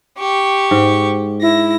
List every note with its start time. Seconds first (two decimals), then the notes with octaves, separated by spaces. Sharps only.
0.17 G4 C#6
0.71 G#2
1.42 E4 A#6